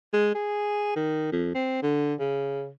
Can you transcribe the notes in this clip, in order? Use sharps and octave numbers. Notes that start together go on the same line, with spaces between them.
G#3
G#4
D#3
F2
C4
D3
C#3